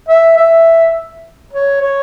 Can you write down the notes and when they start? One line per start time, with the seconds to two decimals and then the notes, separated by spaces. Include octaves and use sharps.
0.09 E5
0.37 E5
1.53 C#5
1.82 C#5